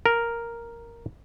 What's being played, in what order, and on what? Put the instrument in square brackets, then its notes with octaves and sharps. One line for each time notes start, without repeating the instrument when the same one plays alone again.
[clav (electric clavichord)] A#4